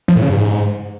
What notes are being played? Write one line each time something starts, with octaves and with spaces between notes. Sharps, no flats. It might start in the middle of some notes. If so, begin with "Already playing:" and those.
F3
A2
C#3
G2
G#2